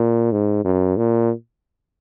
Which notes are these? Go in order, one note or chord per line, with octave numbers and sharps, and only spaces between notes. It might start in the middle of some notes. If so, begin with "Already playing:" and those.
Already playing: A#2
G#2
F#2
A#2